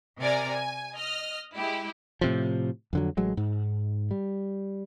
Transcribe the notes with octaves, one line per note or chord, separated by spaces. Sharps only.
C3 A#4 D5 G#5 A#5
G#5
D#5 F6
G#3 E4 G4
A2 C3 F3
F2 D3 F#3
A1 F#3 G#3
G#2
G3